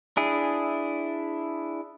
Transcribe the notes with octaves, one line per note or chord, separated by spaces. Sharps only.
D4 E4 G#4